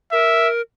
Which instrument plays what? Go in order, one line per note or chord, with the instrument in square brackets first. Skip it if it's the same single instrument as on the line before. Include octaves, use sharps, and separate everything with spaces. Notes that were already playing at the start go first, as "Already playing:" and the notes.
[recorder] A#4 [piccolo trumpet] E5